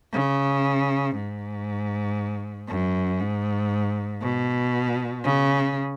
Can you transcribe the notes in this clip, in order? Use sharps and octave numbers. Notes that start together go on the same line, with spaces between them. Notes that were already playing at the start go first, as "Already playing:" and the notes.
C#3
G#2
F#2
G#2
B2
C#3